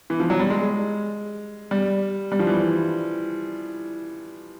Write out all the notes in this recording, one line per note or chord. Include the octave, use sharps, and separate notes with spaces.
E3
F3
F#3
G3
G#3
G3
G3
F3
E3